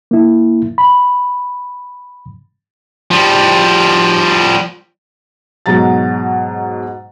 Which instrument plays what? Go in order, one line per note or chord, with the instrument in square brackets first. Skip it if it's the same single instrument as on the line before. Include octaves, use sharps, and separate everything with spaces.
[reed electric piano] A#3 E4
B5
[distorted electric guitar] F3 G3
[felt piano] G#2 B2 F#3 A#5 A6